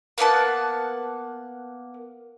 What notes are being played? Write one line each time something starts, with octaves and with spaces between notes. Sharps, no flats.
A#3 B3 F#5 A5